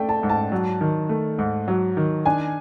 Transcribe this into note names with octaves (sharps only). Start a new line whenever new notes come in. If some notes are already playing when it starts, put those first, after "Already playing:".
Already playing: A3 D5 G5
A5
G#2
A5
F#3
D#3
A3
G#2
F#3
D#3
D4 G#5